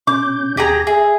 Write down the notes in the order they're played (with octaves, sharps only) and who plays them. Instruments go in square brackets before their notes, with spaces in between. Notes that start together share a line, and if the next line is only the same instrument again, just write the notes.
[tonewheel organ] B2 C#4 G6 [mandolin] D6
[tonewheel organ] D#2 A#6 [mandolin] G4 G#4 A#5
[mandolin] G#4 [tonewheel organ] E5